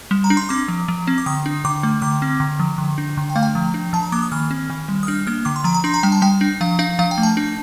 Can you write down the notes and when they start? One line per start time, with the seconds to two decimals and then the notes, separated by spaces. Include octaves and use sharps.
0.11 G3
0.24 A#5
0.30 D4
0.37 C6
0.49 C4 D6
0.68 F3
0.88 F3
1.07 C4
1.18 D6
1.26 D3 D#6
1.46 D4
1.65 D3 D6
1.83 A3
2.02 D3 D6
2.22 C4
2.40 D3
2.60 F3
2.78 D3
2.98 D4
3.17 D3
3.30 G5
3.36 A3 F5
3.43 G5
3.55 F3
3.74 D4
3.93 F3 A5
4.03 A#5
4.12 A#3 D6
4.22 D#6
4.32 D#3 F6
4.51 C4
4.70 D#3
4.89 G3
5.03 D#6
5.07 D4 F6
5.27 A#3 F6
5.45 D3 D6
5.56 C6
5.64 F3 A#5
5.74 A#5
5.84 D4 C6
5.94 A#5
6.03 G3 G5
6.12 A5
6.22 G3 G5
6.41 D4
6.61 F3 F5
6.79 D4 F5
6.99 F3 F5
7.11 G5
7.18 A3
7.23 A5
7.37 D4